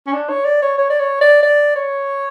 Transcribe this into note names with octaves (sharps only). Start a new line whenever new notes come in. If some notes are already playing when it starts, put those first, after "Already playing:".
C#4
D4
C#5
D5
C#5
C#5
D5
C#5
D5
D5
C#5